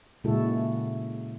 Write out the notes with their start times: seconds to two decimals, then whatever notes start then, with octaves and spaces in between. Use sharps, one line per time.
0.24 A#2 C#3 G#3 E4 F#4 A4